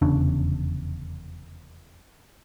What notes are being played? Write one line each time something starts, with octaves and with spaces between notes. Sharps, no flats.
F1 E2 C#3 D4